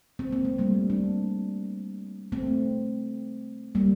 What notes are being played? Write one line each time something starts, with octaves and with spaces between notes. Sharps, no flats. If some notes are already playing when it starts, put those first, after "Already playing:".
C4
A#3
A3
G3 A#3
A#3 D4
A3 C4
G3 A#3